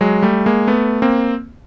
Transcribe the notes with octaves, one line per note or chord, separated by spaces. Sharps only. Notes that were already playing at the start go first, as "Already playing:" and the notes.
F#3 G#3
G3 A3
G#3 A#3
A3 B3
A#3 C4